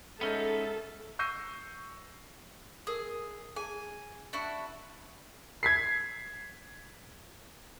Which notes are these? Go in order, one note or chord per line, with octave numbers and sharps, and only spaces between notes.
G#3 B3 C#4 D#4 A4 E5
C#6 E6 G6 A#6 C7 D#7
G#4 A#4 D#6
G#4 G#5
D4 E4 F#4
G#6 B6 C7